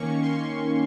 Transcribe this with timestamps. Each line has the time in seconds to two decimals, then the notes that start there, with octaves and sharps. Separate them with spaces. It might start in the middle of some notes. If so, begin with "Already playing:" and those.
Already playing: D#3 A#3 C#4 C#6
0.23 C6